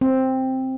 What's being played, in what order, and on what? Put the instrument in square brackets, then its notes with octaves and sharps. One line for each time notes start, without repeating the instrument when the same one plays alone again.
[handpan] C4